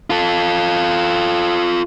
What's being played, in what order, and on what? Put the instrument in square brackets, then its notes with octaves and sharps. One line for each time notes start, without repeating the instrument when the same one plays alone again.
[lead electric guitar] F4 A4